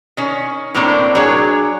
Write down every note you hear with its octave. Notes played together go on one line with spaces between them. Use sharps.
D#3 C#4
A2 A#3 C4 D4 A#4 C#5
F#3 D4 G#4 C#5